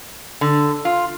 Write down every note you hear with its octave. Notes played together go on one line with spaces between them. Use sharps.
D3
F4